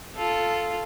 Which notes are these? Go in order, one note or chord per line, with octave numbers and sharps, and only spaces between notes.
F4 A4